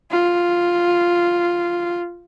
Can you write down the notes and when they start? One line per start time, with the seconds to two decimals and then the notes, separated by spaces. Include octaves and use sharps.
0.11 F4